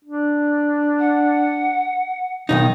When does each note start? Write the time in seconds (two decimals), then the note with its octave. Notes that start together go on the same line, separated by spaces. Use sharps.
0.05 D4
0.99 F#5
2.49 B1 G#2 D#3 D#4